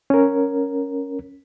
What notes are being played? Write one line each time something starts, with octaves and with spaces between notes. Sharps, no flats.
C#4 A#4